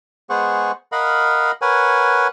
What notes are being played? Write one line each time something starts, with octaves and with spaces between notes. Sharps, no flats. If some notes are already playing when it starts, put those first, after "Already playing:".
G#3 B3 G#4 C5 F#5 C#6
A#4 D#5 F5 F#5 B5
A#4 B4 C#5 F#5 G#5